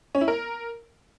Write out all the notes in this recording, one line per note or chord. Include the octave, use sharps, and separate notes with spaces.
C#4
E4
A#4